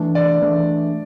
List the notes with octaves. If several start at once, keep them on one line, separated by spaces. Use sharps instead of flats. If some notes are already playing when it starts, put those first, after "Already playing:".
Already playing: E3 A3 D4
D5
E3 A3 D4